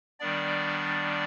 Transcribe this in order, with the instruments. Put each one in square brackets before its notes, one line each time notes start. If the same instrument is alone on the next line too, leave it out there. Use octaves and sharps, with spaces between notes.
[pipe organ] D#3 G3 B3 D4 D5